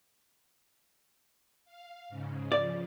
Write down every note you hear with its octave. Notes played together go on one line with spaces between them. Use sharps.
F5
G#2 C#3
C#3 F3 D5